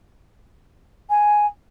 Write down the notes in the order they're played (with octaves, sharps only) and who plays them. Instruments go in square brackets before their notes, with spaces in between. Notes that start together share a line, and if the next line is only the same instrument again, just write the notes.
[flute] G#5